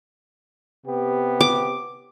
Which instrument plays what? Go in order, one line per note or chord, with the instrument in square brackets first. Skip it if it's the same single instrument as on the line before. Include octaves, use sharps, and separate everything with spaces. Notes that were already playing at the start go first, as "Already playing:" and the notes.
[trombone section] C3 B3 G4
[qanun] D6